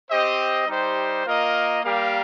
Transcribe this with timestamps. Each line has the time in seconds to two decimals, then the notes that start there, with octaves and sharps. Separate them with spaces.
0.09 C4 G4 C5 D#5
0.67 G3 D#4 G4 C5
1.25 A#3 F4 A#4 D#5
1.84 G3 A#3 G4 A#4 F5